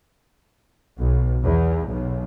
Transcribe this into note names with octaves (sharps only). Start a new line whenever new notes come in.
B1
E2
B1